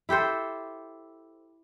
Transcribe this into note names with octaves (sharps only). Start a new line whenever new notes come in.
E4 G4 A4 C5